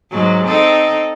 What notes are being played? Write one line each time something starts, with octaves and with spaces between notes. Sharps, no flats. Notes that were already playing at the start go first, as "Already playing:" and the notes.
G#2 F#3
C4 D#4 A4